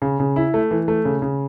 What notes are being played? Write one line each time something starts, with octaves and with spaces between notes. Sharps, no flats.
C#3
C#3
E4
A3
E3
A3
C#3
C#3